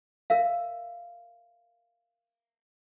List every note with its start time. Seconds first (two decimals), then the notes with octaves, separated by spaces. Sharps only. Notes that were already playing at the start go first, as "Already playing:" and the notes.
0.30 A#4 E5 F5